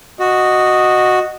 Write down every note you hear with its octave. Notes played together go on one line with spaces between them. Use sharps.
F#4 D#5